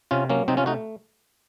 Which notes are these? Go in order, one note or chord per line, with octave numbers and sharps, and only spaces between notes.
C3 C#4 F4
F#3 A#3 C#4
C3 C4 D#4
C#4 F4
A3 D#4 F#4